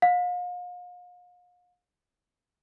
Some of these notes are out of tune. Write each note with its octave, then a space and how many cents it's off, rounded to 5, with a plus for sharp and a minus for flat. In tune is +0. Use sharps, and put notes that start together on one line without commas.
F5 +40